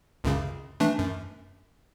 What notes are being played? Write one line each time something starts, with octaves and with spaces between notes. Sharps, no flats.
C#2 F#2 C#3
E3 A3 D4
F#2